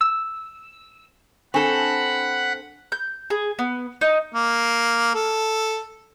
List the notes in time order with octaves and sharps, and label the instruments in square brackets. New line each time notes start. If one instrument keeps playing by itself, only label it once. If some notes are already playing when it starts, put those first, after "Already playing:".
[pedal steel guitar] E6
[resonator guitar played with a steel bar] C4 A4 [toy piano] D4 G#5 C#6 [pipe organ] F#5 B5
[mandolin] G6
G#4
B3
D#4
[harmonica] A#3
A4